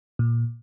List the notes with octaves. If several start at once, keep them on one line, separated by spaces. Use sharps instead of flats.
A#2